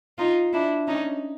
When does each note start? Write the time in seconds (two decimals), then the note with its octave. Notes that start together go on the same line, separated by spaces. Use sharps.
0.18 D#4 F4
0.53 D4 E4
0.87 C#4 D#4